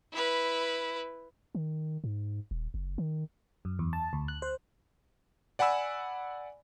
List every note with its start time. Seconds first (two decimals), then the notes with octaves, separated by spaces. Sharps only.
0.12 E4 B4
1.55 D#3
2.04 G#2
2.51 D#1
2.74 F#1
2.98 D#3
3.65 F#2
3.79 E2
3.93 A5
4.13 D2
4.28 F#6
4.42 C5
5.59 D5 F#5 G#5 B5 E6